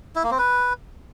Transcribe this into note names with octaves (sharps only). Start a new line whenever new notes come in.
E4
A#3
C4
B4